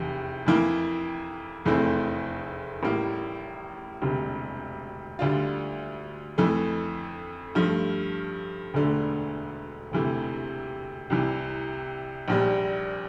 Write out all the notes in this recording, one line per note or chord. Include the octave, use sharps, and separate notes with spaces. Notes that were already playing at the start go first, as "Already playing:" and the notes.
Already playing: F1 E2 C3
F2 E3 A#3 E4
F1 E2 E3 A3 C4
A1 A2 G3 A#3 E4
E1 D2 C3 G3
D2 D3 G3 D4 F4
F2 E3 A3
G2 F3 A3
E1 D2 D3 A3
E1 D2 C3 E3 A3
C2 C3 E3
A#1 A#2 G3